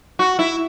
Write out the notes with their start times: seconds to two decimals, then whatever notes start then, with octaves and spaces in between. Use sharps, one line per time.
0.19 F#4
0.39 E4